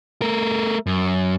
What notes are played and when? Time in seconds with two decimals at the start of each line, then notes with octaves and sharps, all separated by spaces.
0.22 A3 A#4
0.87 F#2